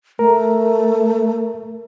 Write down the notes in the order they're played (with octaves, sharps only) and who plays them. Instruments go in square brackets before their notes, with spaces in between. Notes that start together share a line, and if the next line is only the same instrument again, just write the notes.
[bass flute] A3 [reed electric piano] A#4